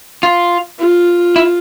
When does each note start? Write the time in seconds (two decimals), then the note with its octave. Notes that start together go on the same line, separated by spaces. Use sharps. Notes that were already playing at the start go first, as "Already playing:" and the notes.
0.23 F4
0.79 F4
1.36 E4